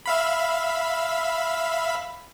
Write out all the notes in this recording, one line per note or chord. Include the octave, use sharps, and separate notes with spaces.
E5 F5 B5